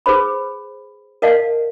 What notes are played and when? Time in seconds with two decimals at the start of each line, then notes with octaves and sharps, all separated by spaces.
0.06 G#4 B4 C5 B5
1.22 A#4 D5 D#5 F5 F#5 A5